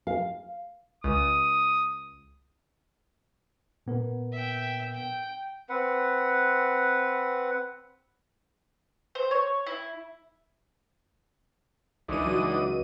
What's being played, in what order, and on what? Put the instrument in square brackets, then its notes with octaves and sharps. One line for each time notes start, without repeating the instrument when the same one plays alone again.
[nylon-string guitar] F5
[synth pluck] C#2 [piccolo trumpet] D#6
[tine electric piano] A#2 B3 A#4
[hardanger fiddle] E5 G5
G5
[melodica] C4 B4 F#5
[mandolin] C5
C#5
E4
[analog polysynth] C#2 D#7 [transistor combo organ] E3 D4 D#4
[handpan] F#3 F#4